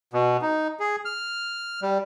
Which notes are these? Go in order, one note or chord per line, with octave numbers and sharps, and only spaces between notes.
B2
D#4
G#4
F6
G3